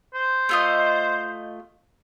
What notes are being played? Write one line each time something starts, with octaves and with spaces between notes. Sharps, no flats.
C5
A3 F4 D#5